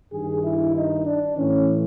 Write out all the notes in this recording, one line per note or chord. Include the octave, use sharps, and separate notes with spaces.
G2 D#3 G#4
E4
D#4
D4
A2 E3 C#4